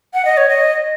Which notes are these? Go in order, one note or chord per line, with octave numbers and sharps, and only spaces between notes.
F#5
D#5
C#5
D#5